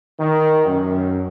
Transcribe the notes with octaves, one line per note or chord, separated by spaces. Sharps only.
D#3
F#2